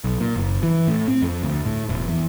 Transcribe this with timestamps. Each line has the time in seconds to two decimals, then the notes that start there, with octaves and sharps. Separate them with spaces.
0.04 B1
0.20 A#2
0.36 F#1
0.63 E3
0.87 A2
1.08 C4
1.22 F2
1.43 D2
1.66 A2
1.89 E1
2.09 E2